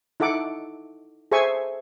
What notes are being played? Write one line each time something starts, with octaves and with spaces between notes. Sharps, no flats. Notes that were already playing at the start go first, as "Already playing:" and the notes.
D#4 E4 A4 F#5 D6
G#4 A4 C5 E5 G#5 C#6